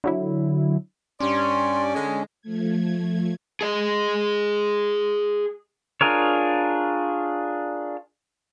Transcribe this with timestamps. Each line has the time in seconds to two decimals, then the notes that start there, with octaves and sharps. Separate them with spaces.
0.04 D3 F#3 E4
1.20 G2 C#4 D5 C6
1.95 D3 G#3
2.42 F3 A3 G#6
3.61 G#4 D#5
6.01 D4 F4 G#4 A#4 C#5